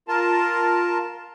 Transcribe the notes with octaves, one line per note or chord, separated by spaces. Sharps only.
F4 A#4 A5